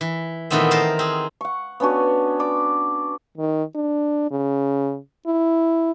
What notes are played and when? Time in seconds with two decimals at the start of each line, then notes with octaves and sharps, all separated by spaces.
0.01 E3
0.50 A#2 D#3 E3 A3 B3 C4
0.71 A#4 C5 A5
0.99 C4 G#4
1.41 F#5 C#6
1.80 B3 C#4 D4 F#4
2.39 D5 B5 D6
3.38 D#3
3.75 D4
4.31 C#3
5.27 E4